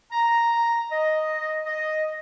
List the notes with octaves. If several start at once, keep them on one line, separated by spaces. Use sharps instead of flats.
A#5
D#5
D#5